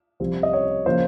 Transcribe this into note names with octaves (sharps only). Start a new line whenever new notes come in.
C2 C3 F3 C4
D#5
C#5
C#3 F3 A#3 C#4 C5